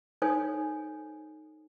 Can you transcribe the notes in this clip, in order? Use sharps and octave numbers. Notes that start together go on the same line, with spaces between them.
D#4 A4 C5 C#5 G#5 D#6